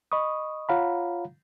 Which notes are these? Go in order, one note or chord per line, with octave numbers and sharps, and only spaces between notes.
D#5 B5 C#6 D#6
F4 C#5 F5 F#5 A#5 B5